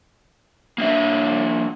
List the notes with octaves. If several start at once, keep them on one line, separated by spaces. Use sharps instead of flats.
A#3 D4 E5